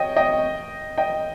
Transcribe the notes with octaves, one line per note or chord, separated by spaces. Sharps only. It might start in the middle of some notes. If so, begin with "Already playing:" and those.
Already playing: C#5 D#5 G5
D#5 G5
D#5 G5